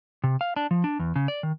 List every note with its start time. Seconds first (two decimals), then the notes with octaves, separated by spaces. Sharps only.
0.24 C3
0.41 F5
0.56 D4
0.71 F3
0.84 D4
0.99 E2
1.16 C#3
1.28 D5
1.43 D#3